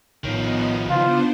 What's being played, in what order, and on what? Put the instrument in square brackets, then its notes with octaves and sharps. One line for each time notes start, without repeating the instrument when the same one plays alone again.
[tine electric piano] A#1 A2 C#5 [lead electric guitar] D#3 F3 [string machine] B3 D#4
[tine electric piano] C#3 E4 [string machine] B3 D4 C5 [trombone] F4